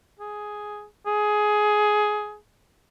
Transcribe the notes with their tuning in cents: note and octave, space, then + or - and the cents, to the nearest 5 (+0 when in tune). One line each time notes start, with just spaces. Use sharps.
G#4 +5
G#4 +15